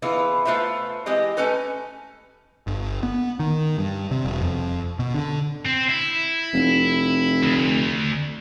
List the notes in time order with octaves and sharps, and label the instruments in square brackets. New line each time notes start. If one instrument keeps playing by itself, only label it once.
[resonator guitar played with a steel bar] E3 B3 E4 F4 G#4 B4
A3 F4 B4 C5 E5
E3 G#3 C4 G4 D#5
A3 C#4 A4 B4 G#5
[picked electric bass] G1
B3
D#3
G2
C3
E1
F2
B2
D3
[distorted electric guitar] C4
E4
[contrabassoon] F1
[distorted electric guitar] D2